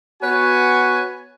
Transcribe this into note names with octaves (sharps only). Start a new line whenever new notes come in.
B3 F#4 B4 C#5 G#5